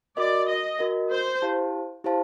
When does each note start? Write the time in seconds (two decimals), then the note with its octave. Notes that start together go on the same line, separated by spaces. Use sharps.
0.17 F#4 A#4 D5 D#5
0.49 D#5
0.79 F#4 A#4 D#5
1.11 C5
1.42 E4 G4 C5 F5 A5
2.04 E4 G4 C5 F5 A5